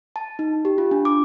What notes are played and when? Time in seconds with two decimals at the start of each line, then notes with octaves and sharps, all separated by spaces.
0.16 A5
0.39 D#4
0.65 G4
0.78 F4
0.91 D4
1.05 D6